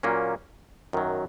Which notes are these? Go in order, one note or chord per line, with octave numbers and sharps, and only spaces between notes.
A#2 F#3 A#3 C#4
F#2 D#3 F#3